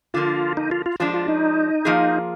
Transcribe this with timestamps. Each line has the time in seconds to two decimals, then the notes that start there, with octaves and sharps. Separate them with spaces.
0.14 D3 F3 A#3 F4
0.57 D#4
0.71 F4
0.86 F4
1.00 F3 G#3 D4 F4
1.14 F4
1.28 D#4
1.85 F3 A#3 F4 G#4